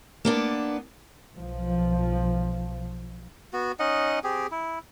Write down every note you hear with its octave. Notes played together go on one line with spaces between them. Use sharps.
A#3 B3 D4
B1 F3
B3 F#4
C#4 D#4 D#5 F#5
C4 G4 G#4
E4